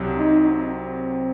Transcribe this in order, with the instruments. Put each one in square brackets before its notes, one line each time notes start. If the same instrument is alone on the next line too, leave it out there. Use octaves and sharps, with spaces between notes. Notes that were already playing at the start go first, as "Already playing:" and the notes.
Already playing: [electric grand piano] C2 C3 F#3
[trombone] D#4
C4